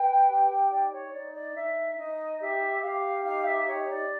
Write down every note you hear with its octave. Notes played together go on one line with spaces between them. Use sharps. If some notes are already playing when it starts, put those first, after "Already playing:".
Already playing: B4 G5
G4
D#4 D5
C#5
D#4 D5
D5
D#4 E5
D#4 D#5
G4 E5
G4 F5
D#4 F5
E5
G4 C#5
D5